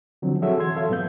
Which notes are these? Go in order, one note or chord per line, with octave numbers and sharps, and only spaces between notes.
D3 F3 F#3 C4
F#4 G#4 A4 C#5 E5
E3 C6 G#6
A4 E5 F5
A2 F#3 B3 G6